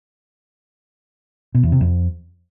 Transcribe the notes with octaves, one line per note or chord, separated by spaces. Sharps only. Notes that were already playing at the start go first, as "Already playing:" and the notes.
B2
E2
C3
F2